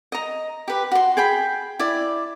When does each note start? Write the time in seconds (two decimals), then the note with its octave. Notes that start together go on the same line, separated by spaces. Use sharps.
0.12 D#5 A#5
0.68 G4 B4
0.91 F#4 C6
1.17 G#4 G5 B5
1.79 E4 D5